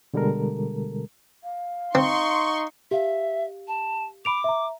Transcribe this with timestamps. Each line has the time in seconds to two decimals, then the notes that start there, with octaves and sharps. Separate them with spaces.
0.14 B2 D3 G3 G#3 A4 A#4
1.43 F5
1.95 C4 D#4 C6 C#6
2.91 G4 E5 F5
3.68 A5
4.25 B5 D6 D7 F7
4.44 E5 A#5